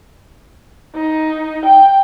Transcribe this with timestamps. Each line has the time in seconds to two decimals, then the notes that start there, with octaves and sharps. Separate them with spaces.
0.95 D#4
1.65 G5